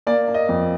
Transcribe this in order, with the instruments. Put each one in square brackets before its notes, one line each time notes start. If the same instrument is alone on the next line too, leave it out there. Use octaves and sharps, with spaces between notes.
[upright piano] A#3 D5
A#3
D#5
F2